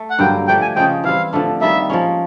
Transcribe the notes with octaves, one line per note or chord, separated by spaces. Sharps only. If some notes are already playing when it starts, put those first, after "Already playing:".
Already playing: A3
F#5
G2 D3 F#3 A#3 G5
F3 A3 D4 G5
G#5
C#3 F3 G#3 G5
E3 G3 C4 F5
D3 F3 A3 D4
D#3 G3 A#3 E5
F3 G#3 C#4